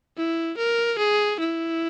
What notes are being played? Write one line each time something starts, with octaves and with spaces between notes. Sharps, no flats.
E4
A#4
G#4
E4